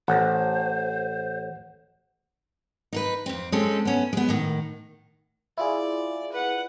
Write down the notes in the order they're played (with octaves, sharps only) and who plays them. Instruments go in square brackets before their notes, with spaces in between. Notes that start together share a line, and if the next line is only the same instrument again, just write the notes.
[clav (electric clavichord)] A1 [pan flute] C5 [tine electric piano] F#5
[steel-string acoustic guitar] D#4 A#4 B4
F2 C4
G#3 C4 C#4 A4
B3 C#4
G#3 B3
A2 D#3
[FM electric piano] E4 F4 G#4 [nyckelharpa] D5
[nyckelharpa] B4 F#5